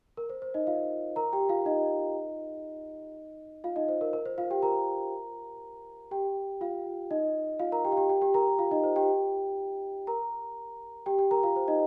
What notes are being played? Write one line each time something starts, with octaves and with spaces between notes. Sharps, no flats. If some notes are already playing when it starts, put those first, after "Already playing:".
A#4
C5
C5
D#4 D#5
F4 F5
A#4 A#5
G4 G5
F4 F5
D#4 D#5
F4 F5
D#4 D#5
C5
A#4
A#4
C5
F4 F5
G4 G5
A#4 A#5
G4 G5
F4 F5
D#4 D#5
F4 F5
A#4 A#5
G4 G5
F5
G4 G5
G4 G5
G4 G5
A#4 A#5
F4 F5
D#4 D#5
C5
G4 G5
A#4 A#5
G4 G5
G4 G5
A#4 A#5
F4 F5
C5
D#4 D#5